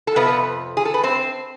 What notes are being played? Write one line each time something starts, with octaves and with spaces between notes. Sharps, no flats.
A4
F2 C3 F3 B3 B4
G#4
A4
B4
C4 C5